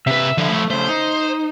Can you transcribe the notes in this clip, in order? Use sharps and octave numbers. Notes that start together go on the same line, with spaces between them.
C3 B4 E5
D3 F3 E4
A3
C#3 A3 C5
D#4